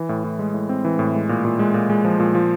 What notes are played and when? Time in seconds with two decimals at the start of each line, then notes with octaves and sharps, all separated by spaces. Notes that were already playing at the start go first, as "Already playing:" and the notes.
Already playing: E3
0.09 A2
0.24 A2
0.39 G#3
0.54 A2
0.69 C4
0.85 E3
0.99 A2
1.14 G#3
1.29 A#2
1.45 A#2
1.59 G#3
1.74 A#2
1.90 G#3
2.05 F3
2.20 A#2
2.35 F3